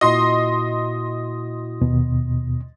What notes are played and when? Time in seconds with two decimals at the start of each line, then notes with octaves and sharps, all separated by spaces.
0.01 A#2 E4 F#4 D#5 C6
1.81 D#2 B2